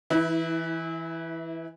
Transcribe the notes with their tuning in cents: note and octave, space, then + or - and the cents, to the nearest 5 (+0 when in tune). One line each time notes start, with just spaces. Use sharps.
E3 +0 E4 -30